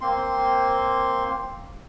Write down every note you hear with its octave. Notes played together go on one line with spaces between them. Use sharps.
A#3 C4 C6